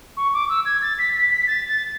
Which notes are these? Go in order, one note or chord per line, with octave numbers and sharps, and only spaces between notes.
C#6
D6
E6
G#6
A6
B6
B6
B6
A6
A6